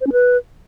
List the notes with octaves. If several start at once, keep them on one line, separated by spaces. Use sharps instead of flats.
C5
C#4
B4